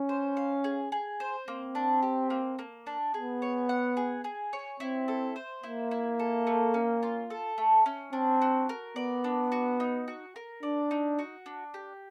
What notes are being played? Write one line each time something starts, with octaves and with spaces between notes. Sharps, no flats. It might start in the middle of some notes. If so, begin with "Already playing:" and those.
Already playing: C#4
C5
F5
G#4
G#4
C5
A#3 C4
D4
G4
A#3
A#3
D4
B3 G#4
C#5
F#5
G#4
G#4
C#5
C4 E4
A4
C5
A#3 E4
E4
A4
A3
C#4
F4
A4
A3
C#4
C4 D4
F#4
A#4
B3 D5
D4
F#4
D#4
F#4
A#4
D4 D5
D#4
F#4
D4
G4